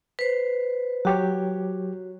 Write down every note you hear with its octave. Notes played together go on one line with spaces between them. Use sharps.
B4 C5
F#3 F#4 G4 C#5